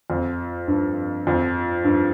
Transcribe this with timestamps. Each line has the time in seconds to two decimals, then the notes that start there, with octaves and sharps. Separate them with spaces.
0.10 F2
0.68 G2
1.27 F2
1.84 G2